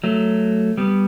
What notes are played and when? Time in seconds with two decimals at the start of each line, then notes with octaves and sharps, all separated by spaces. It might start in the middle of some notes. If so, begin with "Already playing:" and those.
0.04 F#3 A3
0.77 G3 B3